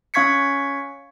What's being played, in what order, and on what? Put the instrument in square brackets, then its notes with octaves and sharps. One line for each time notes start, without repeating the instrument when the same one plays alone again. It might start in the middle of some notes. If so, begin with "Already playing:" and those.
[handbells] C#4 F5 C#6 G#6 B6 C#7